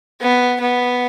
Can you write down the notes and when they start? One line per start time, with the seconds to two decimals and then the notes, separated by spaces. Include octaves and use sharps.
0.21 B3
0.60 B3